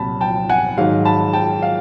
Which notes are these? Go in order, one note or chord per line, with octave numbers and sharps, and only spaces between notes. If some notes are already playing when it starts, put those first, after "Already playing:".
Already playing: C2 A#2 F#3 A5 B5
G5 A5
F#5 G#5
G#2 D#3 F#3 F5
A5 B5
G5 A5
F5